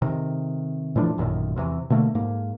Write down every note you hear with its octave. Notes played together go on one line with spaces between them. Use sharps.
C3 D#3
A2 E3 F3 D4
A1 F#2 A#2 D#3
E2 C3 E3
B2 D3 A3 A#3
G#2 A#3